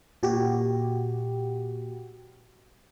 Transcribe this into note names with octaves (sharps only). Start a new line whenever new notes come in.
A#2 F#4 G4